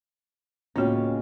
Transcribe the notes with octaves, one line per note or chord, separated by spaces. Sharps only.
C#2 A2 A#3 B3 C#4 F4 F#4 G5